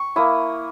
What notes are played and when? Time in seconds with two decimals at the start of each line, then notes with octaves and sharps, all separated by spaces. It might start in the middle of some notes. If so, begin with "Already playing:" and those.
Already playing: C#6
0.16 A#3 E4 D#6